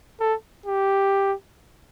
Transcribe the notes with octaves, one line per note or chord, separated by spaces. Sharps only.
A4
G4